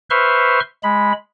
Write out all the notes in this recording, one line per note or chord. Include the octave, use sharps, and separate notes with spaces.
B4 C5 E5 C6 C#6 F6
G#3 B5